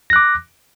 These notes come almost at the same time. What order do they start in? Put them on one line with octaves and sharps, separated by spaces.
A#6 F#6 D6